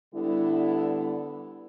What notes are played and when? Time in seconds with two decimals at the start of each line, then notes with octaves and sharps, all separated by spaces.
0.13 D3 G3 B3 E4